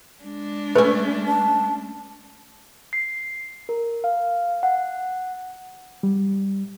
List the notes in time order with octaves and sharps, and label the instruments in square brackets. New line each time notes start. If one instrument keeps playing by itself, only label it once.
[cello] G#3 D4
[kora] A3 C#4 [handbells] B4
[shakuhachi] A5
[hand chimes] C7
A#4
F5
F#5
[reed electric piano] G3